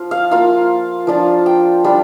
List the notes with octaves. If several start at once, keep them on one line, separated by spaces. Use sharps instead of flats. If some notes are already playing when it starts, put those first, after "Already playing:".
Already playing: F3 F4
F5
A#3 F4 F5
F3 D4 F4
G5
G3 D4 F4